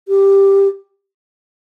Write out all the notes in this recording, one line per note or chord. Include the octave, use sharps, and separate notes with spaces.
G4